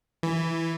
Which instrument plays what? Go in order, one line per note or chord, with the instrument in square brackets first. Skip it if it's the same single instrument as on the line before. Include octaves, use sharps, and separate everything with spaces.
[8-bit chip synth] E3